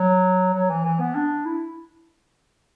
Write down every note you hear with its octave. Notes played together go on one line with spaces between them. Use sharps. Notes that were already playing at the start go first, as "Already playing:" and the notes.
Already playing: F#3
F#3
E3
E3
B3
D4
E4